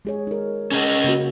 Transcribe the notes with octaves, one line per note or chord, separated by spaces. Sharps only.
G#3 G#4 C#5
D#4 A#4
C#4 G#4 D#5
C#3 A#3 F#4